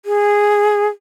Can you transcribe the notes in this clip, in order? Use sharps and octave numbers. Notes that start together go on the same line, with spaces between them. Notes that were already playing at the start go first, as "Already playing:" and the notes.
G#4